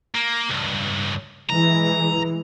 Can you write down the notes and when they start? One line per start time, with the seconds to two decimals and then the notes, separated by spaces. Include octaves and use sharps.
0.15 A#3
0.49 C#2 G2
1.50 E3 G#3 A#5